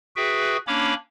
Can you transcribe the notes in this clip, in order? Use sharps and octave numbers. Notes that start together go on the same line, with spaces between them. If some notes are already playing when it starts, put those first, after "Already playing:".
F#4 G#4 B4 E5 G5
A#3 C#4 D4 C#5 B5 D6